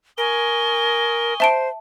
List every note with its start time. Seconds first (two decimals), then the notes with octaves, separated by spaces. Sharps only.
0.18 A#4 G#5 C#6 D#6 G7
1.40 C5 E5 A5 D7